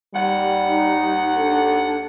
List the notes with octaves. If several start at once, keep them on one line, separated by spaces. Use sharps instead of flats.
D#2 G3 F#5
D#4
D4 A4